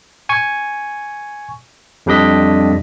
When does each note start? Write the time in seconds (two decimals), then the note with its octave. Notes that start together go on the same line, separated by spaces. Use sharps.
0.29 G#5 C#6
2.06 F2 G3 D4 D#5 B6